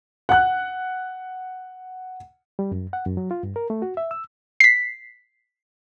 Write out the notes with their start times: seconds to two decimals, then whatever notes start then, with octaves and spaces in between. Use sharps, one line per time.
0.29 F#5 F#6
2.59 G3
2.72 F#2
2.93 F#5
3.06 F#2
3.17 F#3
3.31 F4
3.43 G2
3.56 A#4
3.70 A3
3.82 F#4
3.97 E5
4.11 E6
4.60 B6 C7